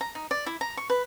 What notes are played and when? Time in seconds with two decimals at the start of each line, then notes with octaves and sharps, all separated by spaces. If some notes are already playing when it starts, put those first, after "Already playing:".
0.01 A#5
0.15 D#4
0.31 D5
0.46 E4
0.61 A#5
0.77 C#6
0.90 B4